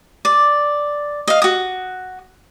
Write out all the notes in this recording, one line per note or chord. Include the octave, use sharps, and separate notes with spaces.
D5
D#5 F5
F#4 D#6